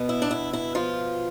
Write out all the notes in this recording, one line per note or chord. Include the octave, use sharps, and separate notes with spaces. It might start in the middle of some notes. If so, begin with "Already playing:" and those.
Already playing: B2 B3
E4
D4
E4
E4
F3 F4